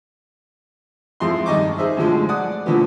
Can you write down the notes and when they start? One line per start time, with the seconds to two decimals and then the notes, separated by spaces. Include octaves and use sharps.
1.20 F2 G#2 E4 G#4 C6
1.46 G2 D#3 D#5 C#6 D6
1.78 D#4 G#4 C5 E5
1.97 F#2 A2 D3 F3 G#3
2.29 D5 F#5 D#6
2.66 A#2 D3 E3 F3 A3 B3